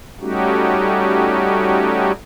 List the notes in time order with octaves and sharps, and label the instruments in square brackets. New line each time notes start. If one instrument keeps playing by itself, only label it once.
[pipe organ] G3 A3 C#4 D#4 F#4 G4